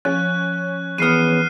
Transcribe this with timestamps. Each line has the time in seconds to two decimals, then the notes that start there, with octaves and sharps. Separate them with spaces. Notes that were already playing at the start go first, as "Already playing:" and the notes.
0.05 F3 C#4 F#6
0.98 E2 B3 F6 C7 D#7